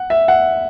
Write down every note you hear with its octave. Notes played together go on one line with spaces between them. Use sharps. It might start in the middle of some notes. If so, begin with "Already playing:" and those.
Already playing: F#5
E5
F#5